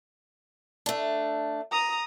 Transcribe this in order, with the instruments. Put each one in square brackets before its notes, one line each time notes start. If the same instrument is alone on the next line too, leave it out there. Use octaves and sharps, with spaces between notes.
[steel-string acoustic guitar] A3 D4
[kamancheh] A#5 D#6